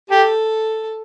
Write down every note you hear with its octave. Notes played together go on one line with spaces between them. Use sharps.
G4 A4